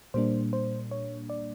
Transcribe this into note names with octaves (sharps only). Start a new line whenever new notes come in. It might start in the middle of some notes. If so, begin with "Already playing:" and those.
A#2 G3 A#3 D4 C5
C5
C#5
D5